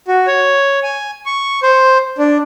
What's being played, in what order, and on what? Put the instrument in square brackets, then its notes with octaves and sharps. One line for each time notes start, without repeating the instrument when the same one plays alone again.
[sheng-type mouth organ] F#4
C#5
G#5
C#6
C5
D4